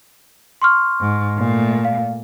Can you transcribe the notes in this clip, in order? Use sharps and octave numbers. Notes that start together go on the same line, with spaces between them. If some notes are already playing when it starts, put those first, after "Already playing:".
C6 C#6 F6
G#2
A#2 A3
F5